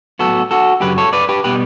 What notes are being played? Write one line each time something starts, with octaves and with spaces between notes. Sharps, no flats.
A2 F#3 B3 F#4 A4
F#4 A4
F#2 C#3 F#3 G4 B4
A4 C#5
B4 D5
G4 B4
B2 G3 B3 G4 B4